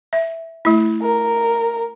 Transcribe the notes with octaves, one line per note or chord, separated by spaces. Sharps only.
E5
A3 E4
A#4